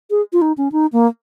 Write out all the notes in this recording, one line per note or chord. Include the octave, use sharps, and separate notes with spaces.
G#4
F4
D#4
C#4
D#4
A#3